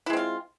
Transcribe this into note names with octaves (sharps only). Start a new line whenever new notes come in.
G#3 C4 E4 F4